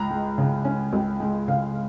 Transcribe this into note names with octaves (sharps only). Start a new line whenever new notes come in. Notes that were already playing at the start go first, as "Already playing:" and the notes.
Already playing: C#2 A#5
G#3
C#3
C#4
C#2
G#3
C#3 F5